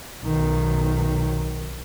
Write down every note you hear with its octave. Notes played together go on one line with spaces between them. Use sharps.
B1 D#3